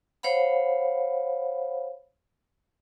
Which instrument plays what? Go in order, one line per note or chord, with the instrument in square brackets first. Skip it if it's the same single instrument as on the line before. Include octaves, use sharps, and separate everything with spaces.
[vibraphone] C5 C#5 F5 F#5 B5